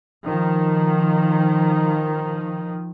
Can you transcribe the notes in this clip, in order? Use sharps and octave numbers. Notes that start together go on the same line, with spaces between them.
D#3 F3